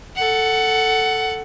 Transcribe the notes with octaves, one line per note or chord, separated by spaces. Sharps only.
A4 F#5